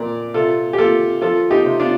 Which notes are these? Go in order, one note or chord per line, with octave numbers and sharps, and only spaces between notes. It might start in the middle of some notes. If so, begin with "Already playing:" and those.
Already playing: A#2 F3 A#4 D5
C3 F4 A4
G4
A#3 F4 A4
F3 F4 A4
D#4 G4
C3
D4 F4